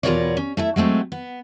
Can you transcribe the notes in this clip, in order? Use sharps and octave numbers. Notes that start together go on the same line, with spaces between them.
E2 B2 F4 A#4 C#5 D5
C#4
A3 E4 E5
F#3 G#3 A3 C4
B3